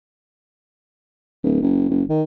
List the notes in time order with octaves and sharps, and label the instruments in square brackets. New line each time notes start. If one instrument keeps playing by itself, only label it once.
[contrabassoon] D1
F#1
F#1
D#3